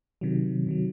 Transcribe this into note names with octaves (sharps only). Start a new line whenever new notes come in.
C3 D#3 F#3
C3 D#3 F#3